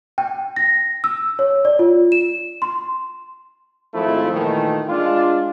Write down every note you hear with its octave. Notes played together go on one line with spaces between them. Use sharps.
G5
A#6
E6
C#5
D5
F4
E7
C6
G#1 F3 A3 E4
A#2 D#3 E3 A3
G#3 D4 F4